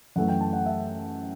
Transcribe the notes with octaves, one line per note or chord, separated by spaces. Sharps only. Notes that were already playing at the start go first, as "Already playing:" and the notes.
F#2 E3 A3 F#5
G5
A5
F#5
E5